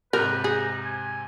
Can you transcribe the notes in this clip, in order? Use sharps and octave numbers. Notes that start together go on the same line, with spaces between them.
G#2 C3 A#4 B4 F#6 G6
D#4 G#4
G#5